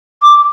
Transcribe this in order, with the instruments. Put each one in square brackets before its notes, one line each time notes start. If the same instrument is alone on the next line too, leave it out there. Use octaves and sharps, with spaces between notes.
[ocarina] D6